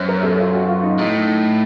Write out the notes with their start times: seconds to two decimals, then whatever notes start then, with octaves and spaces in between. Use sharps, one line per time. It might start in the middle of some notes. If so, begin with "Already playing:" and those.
Already playing: F#2 C5 C#5
0.08 A#4
0.23 A4
0.39 F4
0.54 F#4
0.69 F4
0.83 D#4
0.98 A2 D#4